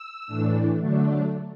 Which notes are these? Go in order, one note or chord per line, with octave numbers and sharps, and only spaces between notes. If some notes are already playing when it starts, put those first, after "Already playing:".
Already playing: E6
A2 E3 A3 D4
D3 F#3 A3 D4